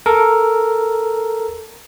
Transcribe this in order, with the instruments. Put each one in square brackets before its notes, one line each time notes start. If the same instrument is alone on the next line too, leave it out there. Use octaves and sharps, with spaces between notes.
[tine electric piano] A4 A#4